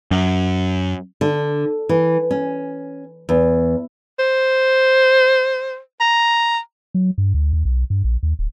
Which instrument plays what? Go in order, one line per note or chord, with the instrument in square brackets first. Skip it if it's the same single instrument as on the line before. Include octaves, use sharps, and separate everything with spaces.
[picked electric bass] F#2
[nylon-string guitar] D3
E3
C#4
E2
[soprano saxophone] C5
A#5
[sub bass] F#3
G2
D2
D#2
B1
G2
A#1
D#2
D1